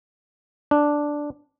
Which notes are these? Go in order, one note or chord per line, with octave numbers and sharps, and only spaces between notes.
D4